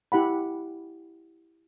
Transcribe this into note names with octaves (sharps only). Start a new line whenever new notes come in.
E4 G4 F#5 B5